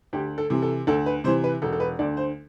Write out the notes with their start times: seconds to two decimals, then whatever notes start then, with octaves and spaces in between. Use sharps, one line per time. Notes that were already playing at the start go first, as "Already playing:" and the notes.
0.13 D2 G4
0.38 A4
0.50 C3 E3
0.62 A4
0.87 D2 A4
1.06 B4
1.24 C3 E3 C5
1.44 B4
1.62 E1 A4
1.72 A4
1.80 B4
1.99 D2 D3 D5
2.17 C5